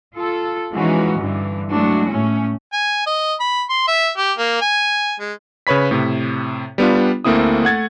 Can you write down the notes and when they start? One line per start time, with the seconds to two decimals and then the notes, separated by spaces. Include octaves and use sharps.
0.15 F4 A4
0.72 E3 F3 G#3 C#4 D#4 F#4
1.18 G2 D3 E3
1.69 F#3 G#3 A3 D4 E4 F#4
2.09 A2 A3 C#4
2.73 G#5
3.07 D#5
3.40 B5
3.70 C6
3.88 E5
4.17 G4
4.38 A#3
4.61 G#5
5.20 G#3
5.67 C#3 B4 C#5 B5 B6
5.91 A2 C3
6.78 G3 B3 D4 F4
7.25 D2 A3 A#3 C4 E4 D#6
7.63 A3 F#5 G#6 A6